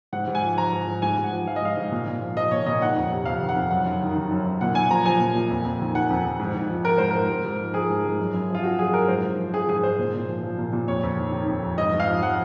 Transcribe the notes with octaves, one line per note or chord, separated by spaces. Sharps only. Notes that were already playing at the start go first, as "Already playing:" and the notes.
G#2 F#5
G#2
G#5
F3
F3 A#5
G#2
G#2
G#2 G#5
G#2
F#5
F3
F3 F5
D#5
G#2 F5
G#2
A#2
A#2
F3
F3 D#5
A#2 C#5
A#2 D#5
D#3 F#5
F2
C3
F2 F5
D#3
F#5
F2
F#2 F#5
F#2
D#3
D#3
F#2
F#2
A#2 F#5
A#2 G#5
F3 A#5
F3 G#5
A#2
A#2
F2
F2
D#3
D#3 F#5
F2
F2
G#2
G#2
F3
F3 A#4
G#2 C5
G#2 A#4
G#2
G#2
F3
F3 G#4
G#2
G#2
F#2
F#2
F3
F4
F3 F#4
F#2 G#4
F#2 A#4
G#2 C5
G#2
F3
F3 G#4
G#2 G#4
G#2 C5
A#2
A#2
F3
F3
A#2
A#2
F2 C#5
F2
D#3
D#3
F2
F2
G#2 D#5
G#2
F5
F3
F3 F#5